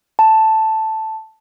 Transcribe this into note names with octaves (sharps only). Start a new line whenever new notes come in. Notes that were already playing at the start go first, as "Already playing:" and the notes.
A5